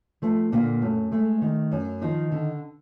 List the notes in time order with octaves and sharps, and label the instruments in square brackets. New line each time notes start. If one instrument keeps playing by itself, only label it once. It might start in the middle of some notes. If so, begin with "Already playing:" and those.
[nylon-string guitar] F3 A3
A#2 D3 A#3
F#2 A3
G#3 A3
D#3
F#2
D#3 F3 D#4
D3